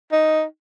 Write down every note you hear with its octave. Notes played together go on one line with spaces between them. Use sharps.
D#4